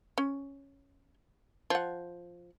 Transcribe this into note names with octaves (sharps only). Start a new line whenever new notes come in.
C#4
F3 F#5